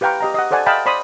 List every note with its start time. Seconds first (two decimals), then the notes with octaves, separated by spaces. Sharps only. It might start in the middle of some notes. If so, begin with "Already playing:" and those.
0.01 G4 B4 F5 G5 A#5 C#6
0.20 G4 D#5 A#5
0.34 D#5 F#5
0.51 A4 C5 D5 F#5 G#5 A5
0.66 D#5 F5 G5 A5 B5
0.86 C5 D5 B5 C6 D#6